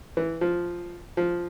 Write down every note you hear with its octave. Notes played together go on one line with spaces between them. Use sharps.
E3
F3
F3